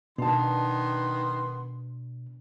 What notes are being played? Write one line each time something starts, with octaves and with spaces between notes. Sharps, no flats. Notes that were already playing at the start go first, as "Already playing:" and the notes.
B2 D#3 B3 D4 A5 C6